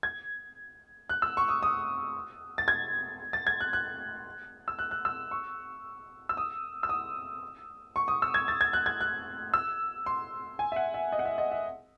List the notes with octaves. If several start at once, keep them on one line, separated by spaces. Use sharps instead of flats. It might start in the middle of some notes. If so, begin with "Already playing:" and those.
G#6
F#6
E6
C#6
D#6
D#6
A6
G#6
A6
G#6
F#6
F#6
E6
F#6
F#6
E6
C#6
E6
D#6
E6
D#6
C#6
D#6
E6
G#6
A6
G#6
F#6
G#6
F#6
E6
C6
G#5
E5
F#5
E5
D#5
F#5
E5
D#5
E5